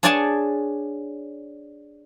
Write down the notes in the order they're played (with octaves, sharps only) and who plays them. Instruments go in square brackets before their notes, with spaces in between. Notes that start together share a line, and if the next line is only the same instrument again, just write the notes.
[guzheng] D4 G#4 C#5 D5 G#5 A5